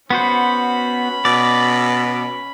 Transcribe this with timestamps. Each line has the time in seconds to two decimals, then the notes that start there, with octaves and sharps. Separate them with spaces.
0.10 B3 C#4 F#4 C5 B5
1.25 B2 D5